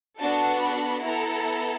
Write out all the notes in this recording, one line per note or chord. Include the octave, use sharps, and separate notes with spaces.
B3 D4 F#4 A4 A5
B5
B3 E4 A4 A#5